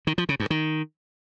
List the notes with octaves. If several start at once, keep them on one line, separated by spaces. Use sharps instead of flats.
D#3
F3
C#3
G2
D#3